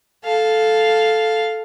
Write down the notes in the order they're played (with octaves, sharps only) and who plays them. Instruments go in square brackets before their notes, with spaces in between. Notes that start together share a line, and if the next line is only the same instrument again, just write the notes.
[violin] A4 F5